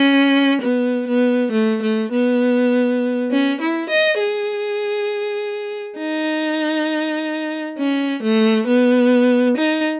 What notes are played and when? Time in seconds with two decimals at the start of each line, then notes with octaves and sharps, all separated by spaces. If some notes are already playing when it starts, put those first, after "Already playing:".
Already playing: C#4
0.62 B3
1.07 B3
1.52 A3
1.82 A3
2.12 B3
3.31 C#4
3.61 E4
3.90 D#5
4.20 G#4
5.98 D#4
7.78 C#4
8.23 A3
8.67 B3
9.57 D#4